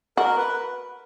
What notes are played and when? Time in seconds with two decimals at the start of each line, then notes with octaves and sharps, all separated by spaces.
0.17 F#4 A#4
0.37 B4